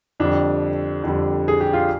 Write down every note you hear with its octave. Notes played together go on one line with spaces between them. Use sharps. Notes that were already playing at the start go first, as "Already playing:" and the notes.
F2 D3 G3 D4
F2 D3 G3
G#4
G4
F4